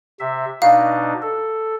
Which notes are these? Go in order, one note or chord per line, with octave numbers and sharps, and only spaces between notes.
C3 E5
B2 D4 D#4 F5
A4